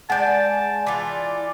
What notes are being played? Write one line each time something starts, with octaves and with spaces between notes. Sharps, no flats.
G#3 D5 F#5 G#5 A5 G6
E3 F4 D5